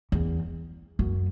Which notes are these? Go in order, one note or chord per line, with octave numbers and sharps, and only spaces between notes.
E2
F#2